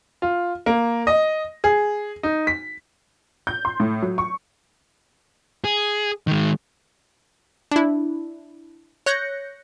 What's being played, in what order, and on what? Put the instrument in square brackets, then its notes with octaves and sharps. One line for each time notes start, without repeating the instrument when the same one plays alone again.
[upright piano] F4
A#3
D#5
G#4
D#4
B6
[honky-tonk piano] G6
C6
A2
F#3
C#6
[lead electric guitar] G#4
D#3 G#3
[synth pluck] D4 E4
C#5 F#6 G6 A#6 C#7